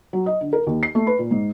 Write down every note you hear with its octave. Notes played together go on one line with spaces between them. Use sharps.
F#3
D#5
D3
A#4
D#2
C7
A3
B4
A#2
G#2